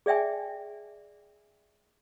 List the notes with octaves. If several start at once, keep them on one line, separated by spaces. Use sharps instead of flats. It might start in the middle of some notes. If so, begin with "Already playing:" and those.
G#4 D5 E5 G5 G#5